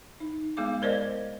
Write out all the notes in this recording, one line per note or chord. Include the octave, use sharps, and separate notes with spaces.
D#4
G#3 B3 G#4 F5 D6
A#4 C5 D5 D#5